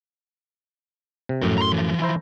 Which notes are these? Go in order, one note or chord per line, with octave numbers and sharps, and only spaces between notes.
C3
F#2 A2 F3 A#4
A#5 C6
E3 F3
E4 C5 A#5